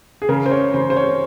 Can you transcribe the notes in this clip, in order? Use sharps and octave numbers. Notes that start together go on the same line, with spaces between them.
G#4
C#3 A#4
C5
C#5
C#3 C5
C5
C#5